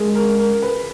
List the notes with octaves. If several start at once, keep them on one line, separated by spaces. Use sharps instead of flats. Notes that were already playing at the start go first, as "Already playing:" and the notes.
Already playing: G#3 G#4 A#4
A#4
A#4
B4